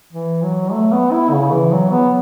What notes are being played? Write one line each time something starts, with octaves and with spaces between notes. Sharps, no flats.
E3
F#3
A3
B3
E4
C#3
E3
F#3
B3